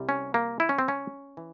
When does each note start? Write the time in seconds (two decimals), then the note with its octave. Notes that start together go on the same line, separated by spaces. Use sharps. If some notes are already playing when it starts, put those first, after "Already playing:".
Already playing: C2 C3 G3
0.09 C#4
0.34 A#3
0.60 E4
0.69 C#4
0.79 C4
0.88 C#4
1.37 E3